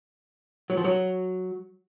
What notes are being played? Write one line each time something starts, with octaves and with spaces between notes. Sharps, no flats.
F#3
F3
F#3